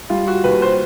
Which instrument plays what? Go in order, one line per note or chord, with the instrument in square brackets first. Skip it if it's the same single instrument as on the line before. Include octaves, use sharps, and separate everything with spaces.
[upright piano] G3 F4
F#4
D#2 B4
C5